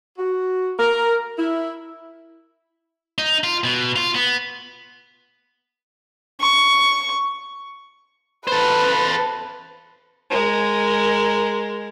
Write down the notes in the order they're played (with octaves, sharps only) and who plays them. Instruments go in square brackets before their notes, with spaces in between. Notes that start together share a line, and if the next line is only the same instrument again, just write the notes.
[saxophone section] F#4
A#4
E4
[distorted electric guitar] D#4
F4
B2
F4
B3
[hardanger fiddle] C#6
[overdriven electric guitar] A4 C5 [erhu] B4
[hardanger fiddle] G#3 A#4